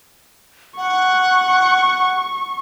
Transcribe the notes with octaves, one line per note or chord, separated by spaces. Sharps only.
F#5 C#6